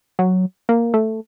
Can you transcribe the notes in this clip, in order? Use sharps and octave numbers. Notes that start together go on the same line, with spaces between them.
F#3
A#3
A3